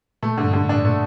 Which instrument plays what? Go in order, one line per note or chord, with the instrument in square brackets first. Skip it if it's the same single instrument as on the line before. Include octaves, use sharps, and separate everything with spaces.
[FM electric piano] A#2 [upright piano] A3
[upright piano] D3
[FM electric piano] G2
[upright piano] D3
[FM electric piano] A2
[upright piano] D4
[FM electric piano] A#2 [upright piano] A3